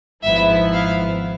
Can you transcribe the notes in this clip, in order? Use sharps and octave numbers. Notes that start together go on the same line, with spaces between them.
G#1 G#2 F3 B3 E4 E5
F5